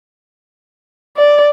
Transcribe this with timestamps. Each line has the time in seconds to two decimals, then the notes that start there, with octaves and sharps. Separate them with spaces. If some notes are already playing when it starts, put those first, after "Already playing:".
1.17 D5